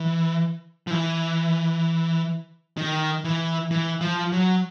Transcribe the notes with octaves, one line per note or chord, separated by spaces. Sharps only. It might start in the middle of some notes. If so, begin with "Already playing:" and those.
Already playing: E3
F3
E3
D#3
E3
E3
F3
F#3